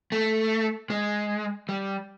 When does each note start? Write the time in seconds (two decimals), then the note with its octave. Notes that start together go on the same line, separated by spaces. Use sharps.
0.12 A3
0.90 G#3
1.69 G3